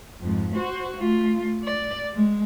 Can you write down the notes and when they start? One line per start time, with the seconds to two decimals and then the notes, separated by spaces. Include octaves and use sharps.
0.22 F2 G#2
0.54 F#4 C5
0.97 A3 F4
1.64 D5
2.14 G#3